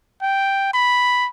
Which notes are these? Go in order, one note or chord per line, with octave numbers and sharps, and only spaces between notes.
G5
B5